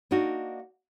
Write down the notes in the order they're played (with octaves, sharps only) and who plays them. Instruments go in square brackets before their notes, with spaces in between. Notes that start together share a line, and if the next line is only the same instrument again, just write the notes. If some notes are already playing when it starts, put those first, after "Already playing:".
[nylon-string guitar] A#3 D4 D#4 F#4